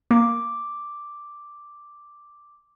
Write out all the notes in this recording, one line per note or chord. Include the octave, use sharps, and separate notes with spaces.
A#3 D6